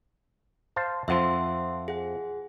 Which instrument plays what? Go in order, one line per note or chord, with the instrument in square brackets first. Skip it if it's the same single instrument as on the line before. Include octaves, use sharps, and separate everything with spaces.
[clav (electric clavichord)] C5 F5 A5
[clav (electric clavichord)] F2 F3 [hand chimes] E5 F#5 C6
[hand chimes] G#4 F#5